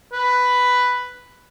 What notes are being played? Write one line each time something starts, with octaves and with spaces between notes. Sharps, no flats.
B4